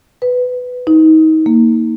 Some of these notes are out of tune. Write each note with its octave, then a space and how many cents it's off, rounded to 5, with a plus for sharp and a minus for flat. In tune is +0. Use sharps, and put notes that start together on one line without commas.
B4 +15
D#4 +30
A#3 -10